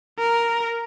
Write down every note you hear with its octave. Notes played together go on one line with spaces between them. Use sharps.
A#4